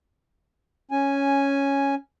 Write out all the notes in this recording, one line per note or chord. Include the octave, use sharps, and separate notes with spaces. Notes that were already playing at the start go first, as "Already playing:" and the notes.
C#4 G#5